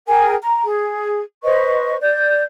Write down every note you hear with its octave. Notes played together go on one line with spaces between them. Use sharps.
G#4 A#4 G5 G#5
A#5
G#4
B4 C5 D#5 C#6
D5 G6